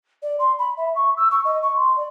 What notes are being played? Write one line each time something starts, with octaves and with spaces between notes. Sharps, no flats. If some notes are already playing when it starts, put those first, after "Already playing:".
D5
C6
B5
E5
C#6
E6
C#6
D#5
C#6
C6
D5